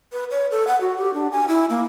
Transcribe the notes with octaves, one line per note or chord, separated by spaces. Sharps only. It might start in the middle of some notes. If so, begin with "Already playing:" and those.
B4
C#5
A4
F#5
F#4
G4
D4
G#5
E4
A#3